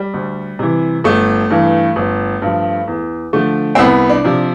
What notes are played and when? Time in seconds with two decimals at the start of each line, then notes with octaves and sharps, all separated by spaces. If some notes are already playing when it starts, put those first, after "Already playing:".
Already playing: G3
0.14 D2
0.59 C3 E3
1.04 G1 A3
1.50 G2 E3
1.96 G1
2.42 G2 F3
2.87 E2
3.33 D3 F3 A3
3.75 C4
3.79 C2 B3
4.09 D4
4.25 C3 F3